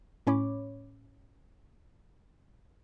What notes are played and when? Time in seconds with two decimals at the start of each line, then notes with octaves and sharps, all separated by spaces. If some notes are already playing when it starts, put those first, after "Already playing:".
0.27 A2 C#4 C#5 B5 D6